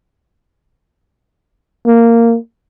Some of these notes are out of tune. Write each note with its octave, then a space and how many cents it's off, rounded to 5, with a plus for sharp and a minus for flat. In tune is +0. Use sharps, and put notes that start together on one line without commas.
A#3 -10